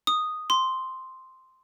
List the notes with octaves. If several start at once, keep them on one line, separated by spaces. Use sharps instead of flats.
D#6
C6